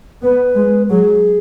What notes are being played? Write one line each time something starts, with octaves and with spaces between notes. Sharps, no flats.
B3 B4
G#3
F#3 G#4